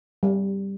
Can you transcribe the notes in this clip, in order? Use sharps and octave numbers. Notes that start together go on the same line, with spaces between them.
G3